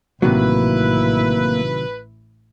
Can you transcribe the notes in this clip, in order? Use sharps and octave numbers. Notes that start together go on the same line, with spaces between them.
A1 C3 D#3 F#3 A#3 E4 B4